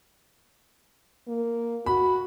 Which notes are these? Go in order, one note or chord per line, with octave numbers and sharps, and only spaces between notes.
A#3
F#4 B5